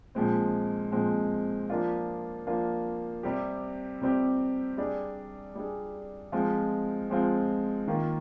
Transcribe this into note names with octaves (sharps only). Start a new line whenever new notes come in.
A#2 F3 G#3 C4
A#2 F3 G#3 C4
F3 A#3 D4 F4
F3 A#3 D4 F4
C3 G3 C4 G4
C3 G3 C4 G4
G3 D4 G#4
G3 D4 G#4
F3 G#3 C4 F4
F3 G#3 C4 F4
D#3 A#3 F4